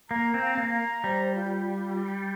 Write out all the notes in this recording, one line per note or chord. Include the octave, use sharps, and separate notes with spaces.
A#3 A#5
C4
F5
A#3
A#5
G3 C5
F4
F4
G4